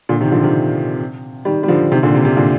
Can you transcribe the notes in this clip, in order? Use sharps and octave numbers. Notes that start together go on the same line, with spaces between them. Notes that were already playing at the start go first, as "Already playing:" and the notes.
A#2 D3
C3 D#3
D3 F3
C3 D#3
D#3 G3
G3
D3 F3
C3 D#3
A#2 D3
C3
C3
A#2 D3